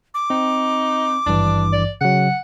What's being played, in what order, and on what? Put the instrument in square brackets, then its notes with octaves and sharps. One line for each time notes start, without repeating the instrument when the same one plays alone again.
[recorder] D6
[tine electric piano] C4 [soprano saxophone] D#4
[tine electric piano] G#1 G2 E3 [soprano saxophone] D4
[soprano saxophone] D5
[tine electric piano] C#3 F#3 [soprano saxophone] F#5